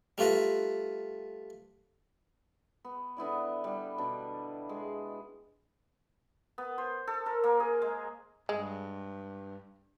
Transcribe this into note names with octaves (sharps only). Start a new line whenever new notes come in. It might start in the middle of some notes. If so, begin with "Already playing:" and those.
G3 A3 F4 B4 A#5
B3
D3 B3 E4 D5
G3 F#5
B2 D4
G#3
B3
C5
A4
A#4
A#3
G#4
G#3
G2 G#3